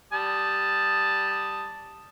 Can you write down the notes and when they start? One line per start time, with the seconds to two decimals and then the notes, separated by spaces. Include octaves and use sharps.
0.13 G3 A5 D#6